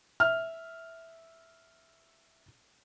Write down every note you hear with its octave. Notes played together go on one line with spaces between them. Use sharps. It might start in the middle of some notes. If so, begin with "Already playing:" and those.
E5 F6